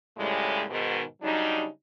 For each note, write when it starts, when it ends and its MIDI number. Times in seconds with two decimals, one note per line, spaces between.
0.18 0.63 39
0.18 0.63 45
0.18 0.63 49
0.18 0.63 55
0.18 0.63 56
0.70 1.01 44
0.70 1.01 47
0.70 1.01 51
1.22 1.66 49
1.22 1.66 54
1.22 1.66 55
1.22 1.66 62
1.22 1.66 63